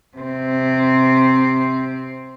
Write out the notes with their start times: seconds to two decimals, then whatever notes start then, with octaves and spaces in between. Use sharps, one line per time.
0.18 C3 C4